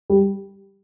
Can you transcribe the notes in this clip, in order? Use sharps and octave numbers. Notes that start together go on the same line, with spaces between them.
G3